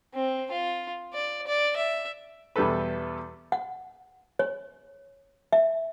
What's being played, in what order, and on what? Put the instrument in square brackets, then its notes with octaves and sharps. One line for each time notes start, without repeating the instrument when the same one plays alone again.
[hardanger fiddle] C4
F4
D5
D5
E5
[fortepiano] E2 B2 G3 E4 A4 B4
[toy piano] F#5
C#5
E5